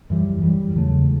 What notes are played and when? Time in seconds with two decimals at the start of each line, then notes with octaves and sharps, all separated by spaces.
0.10 F#2 E3 G3
0.42 F#2 E3 G3
0.75 E2 C#3 F#3 A3